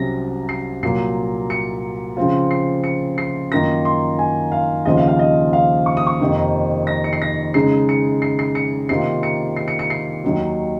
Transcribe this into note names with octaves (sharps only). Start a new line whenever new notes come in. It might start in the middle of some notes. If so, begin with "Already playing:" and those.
Already playing: C2 C3 F#3 C#4 A#6
C7
C2 A#2 F#3 A#3 C7
C#7
C#3 F3 C4 F4
C7
C#7
C7
F#2 D#3 A#3 F4 A#6
C6
G#5
F5
D#2 C#3 F3 C4 F4 D#5
F5
F5
D#5
F5
C#6
D#6
C#6
F2 C3 D#3 A#3
A#6
C#7
C7
A#6
C#3 G#3 D#4 C7
C#7
C7
C7
C#7
C3 D#3 A#3 F4 C7
C#7
C7
C#7
C#7
C7
D#2 D#3 F#3